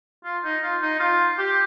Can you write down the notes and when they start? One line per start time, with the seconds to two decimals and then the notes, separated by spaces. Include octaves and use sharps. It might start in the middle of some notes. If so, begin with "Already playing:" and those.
0.25 F4
0.44 D#4
0.63 F4
0.82 D#4
1.00 F4
1.38 G4